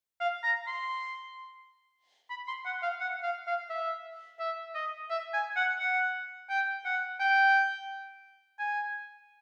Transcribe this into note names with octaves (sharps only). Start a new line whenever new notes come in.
F5
A#5
C6
B5
C6
F#5
F5
F#5
F5
F5
E5
E5
D#5
E5
G#5
F#5
F#5
G5
F#5
G5
G#5